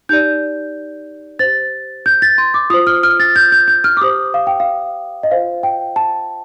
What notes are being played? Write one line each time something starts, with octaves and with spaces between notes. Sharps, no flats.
D#4 G4 D5 G6
G4 C5 A6
G6
A6
C6
D6
F4 C5 D#6
F6
F6
A6
G6
G6
G6
F6
D6
G4 C5 D#6
F5
G5
F5
D#5
F4 C5 F5
G5
A5